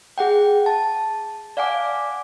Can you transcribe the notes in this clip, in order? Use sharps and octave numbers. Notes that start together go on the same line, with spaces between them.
G#4 F#5 G5
A5
D5 F5 F#5 G#5 D6